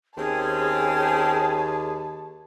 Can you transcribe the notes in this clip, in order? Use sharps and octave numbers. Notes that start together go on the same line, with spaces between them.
D#2 C4 C#4 G#4 A5